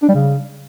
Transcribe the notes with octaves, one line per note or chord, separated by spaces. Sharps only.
D4
G3
C#3